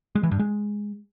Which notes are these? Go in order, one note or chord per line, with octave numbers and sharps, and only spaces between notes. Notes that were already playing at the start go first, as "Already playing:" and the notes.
G#3
E3
G2
G#3